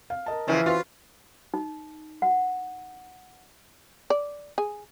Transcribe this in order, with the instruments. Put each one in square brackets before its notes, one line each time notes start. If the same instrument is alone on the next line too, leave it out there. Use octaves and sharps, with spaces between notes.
[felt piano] F5
A#4 D#5 A5
[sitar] C#3 F3 [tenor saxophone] E3
[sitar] F4 [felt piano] F#4 B4 C5
[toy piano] D#4
F#5
[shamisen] D5
G#4